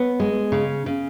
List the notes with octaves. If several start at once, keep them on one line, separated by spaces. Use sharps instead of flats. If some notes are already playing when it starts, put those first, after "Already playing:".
Already playing: B3 C#5
G#3
C#3
C#3